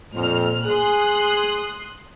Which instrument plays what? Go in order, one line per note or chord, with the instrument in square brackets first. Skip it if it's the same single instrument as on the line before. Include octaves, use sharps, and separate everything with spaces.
[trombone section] F2 [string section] A#2 C5 F6
[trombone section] G#4 [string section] C6 D#6 F#6